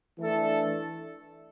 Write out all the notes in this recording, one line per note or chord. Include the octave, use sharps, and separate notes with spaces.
E3 A3 D4 A4